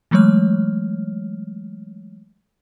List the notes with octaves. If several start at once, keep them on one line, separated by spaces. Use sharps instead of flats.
E3 F#3 G#3 A3 C#5 F6